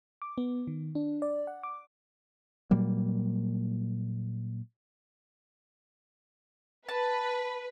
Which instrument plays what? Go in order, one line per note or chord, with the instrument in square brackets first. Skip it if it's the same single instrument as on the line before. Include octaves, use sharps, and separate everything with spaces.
[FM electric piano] D6
B3
D#3
D4
D5
F#5
D6
[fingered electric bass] A#2 F#3 G3 A#3
[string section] B4 [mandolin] A5